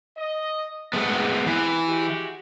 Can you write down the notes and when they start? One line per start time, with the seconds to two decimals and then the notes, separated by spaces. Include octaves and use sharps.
0.17 D#5
0.93 E2 G#2 C3 G#3 A3 B3
1.46 E3
1.87 G#3 F#4 G4